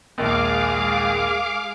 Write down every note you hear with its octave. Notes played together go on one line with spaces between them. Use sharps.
A#1 D#2 G#3 G#4 F5 D6